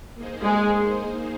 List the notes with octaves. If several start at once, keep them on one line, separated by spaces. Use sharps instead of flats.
A#3 D#4 G#4 C5
G#3